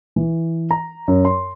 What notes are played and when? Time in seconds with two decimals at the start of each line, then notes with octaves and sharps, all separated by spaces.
0.16 E3
0.71 A#5
1.08 F#2
1.25 C6